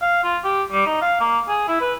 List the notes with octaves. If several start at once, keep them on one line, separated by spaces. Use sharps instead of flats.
F5
F4
G4
G3
D#4
F5
A#3
G#4
E4
B4